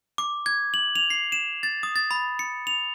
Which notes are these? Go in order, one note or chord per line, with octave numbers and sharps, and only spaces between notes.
D6
G#6
F#7
F7
C7
E7
A6
D#6
A6
B5
C#7
F7